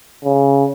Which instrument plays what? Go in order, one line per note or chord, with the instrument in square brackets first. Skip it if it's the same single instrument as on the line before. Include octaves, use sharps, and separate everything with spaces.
[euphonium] C#3